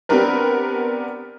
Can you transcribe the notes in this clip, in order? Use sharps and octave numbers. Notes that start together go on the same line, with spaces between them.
B3 C4 D4 G4 A#4 B4